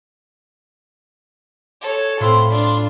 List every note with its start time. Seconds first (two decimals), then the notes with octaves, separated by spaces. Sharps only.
1.82 A4 C#5
2.20 A2 C4 F4 B5 E6
2.50 D4 F4